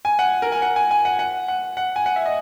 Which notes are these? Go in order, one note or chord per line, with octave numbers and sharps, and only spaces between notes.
G#5
F#5
A#4
G#5
F#5
G#5
G#5
F#5
F#5
F#5
F#5
G#5
F#5
E5
D#5